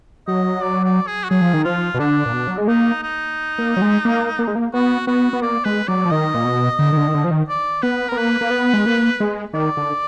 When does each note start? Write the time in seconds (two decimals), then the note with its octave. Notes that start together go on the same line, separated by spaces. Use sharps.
0.27 F#3 D#5
0.62 D5
0.84 D5
1.07 G#4
1.24 F#4
1.30 F#3 G#4
1.41 F3
1.53 D#3
1.64 F3 F4
1.94 B2
1.99 D3 D4
2.26 A#2
2.33 B2
2.48 F#3
2.58 G#3
2.68 A#3 D#4
3.02 D#4
3.58 A#3
3.77 F#3
3.82 G#3
4.05 A#3
4.39 A#3
4.47 G#3
4.55 A#3
4.74 B3 F#4
5.07 B3 F#4
5.33 B3
5.42 A#3 D5
5.65 G#3 B4
5.88 F#3 D5
6.05 F3
6.11 D#3 D#5
6.34 A#2
6.45 B2
6.79 D3
6.92 D#3
6.97 D3
7.08 D#3
7.14 D3
7.24 F3
7.31 D#3
7.49 D5
7.82 B3 B4
8.08 A#4
8.12 B3
8.17 A#3 B4
8.41 A#3
8.51 B3
8.74 G#3
8.86 A#3
9.20 G#3
9.54 D#3 D5
9.77 D3